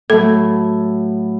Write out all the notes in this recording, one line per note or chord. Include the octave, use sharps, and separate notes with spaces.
A2 F#3 A3 A4